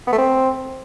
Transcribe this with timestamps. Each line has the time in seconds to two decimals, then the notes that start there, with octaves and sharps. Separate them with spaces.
0.07 B3
0.13 A3
0.18 C4